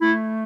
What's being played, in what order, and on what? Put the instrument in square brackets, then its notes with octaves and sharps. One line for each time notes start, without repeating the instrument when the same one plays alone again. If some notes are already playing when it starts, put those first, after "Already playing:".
[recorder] A3 [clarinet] E4